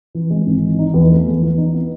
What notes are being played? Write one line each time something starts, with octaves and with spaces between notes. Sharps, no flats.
E3
G#3
G#1
E3
D#4
E2
A3
E2
E3
D#4
B3